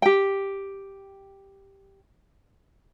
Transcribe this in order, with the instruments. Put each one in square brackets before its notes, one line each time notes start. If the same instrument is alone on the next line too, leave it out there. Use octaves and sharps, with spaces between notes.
[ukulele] G4 G5